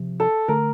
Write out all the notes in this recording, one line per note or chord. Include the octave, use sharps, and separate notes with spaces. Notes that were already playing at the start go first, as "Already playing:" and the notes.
Already playing: C3 F3
A4
D3 A3 A#4